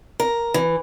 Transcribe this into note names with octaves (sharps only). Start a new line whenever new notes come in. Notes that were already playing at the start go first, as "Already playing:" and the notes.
A#4
E3